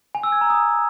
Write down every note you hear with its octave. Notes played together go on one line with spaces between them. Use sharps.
G#5
E6
G#6
A#5
D#6